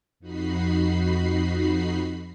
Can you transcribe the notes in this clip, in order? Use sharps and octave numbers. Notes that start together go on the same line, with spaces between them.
F2 D#4 F#4 B5 C7